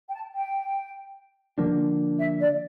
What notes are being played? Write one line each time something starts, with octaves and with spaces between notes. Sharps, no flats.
G5
A5
G5
D3 F3 A#3 D4
E5
D5